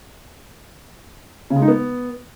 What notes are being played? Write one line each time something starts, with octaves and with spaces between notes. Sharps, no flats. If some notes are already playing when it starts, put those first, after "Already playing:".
C#3
G#3
D#4
B3